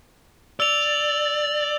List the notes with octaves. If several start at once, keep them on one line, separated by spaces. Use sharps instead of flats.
D5 E6 F7